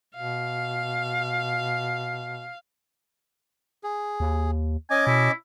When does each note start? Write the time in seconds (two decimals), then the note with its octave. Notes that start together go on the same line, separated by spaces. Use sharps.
0.15 B2 F5
3.84 G#4
4.20 D#2
4.90 C#4 D#5 G#5 D6
5.07 B2 E4